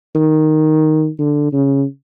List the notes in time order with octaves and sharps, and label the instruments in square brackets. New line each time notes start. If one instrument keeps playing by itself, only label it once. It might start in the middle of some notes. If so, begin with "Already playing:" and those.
[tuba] D#3
D3
C#3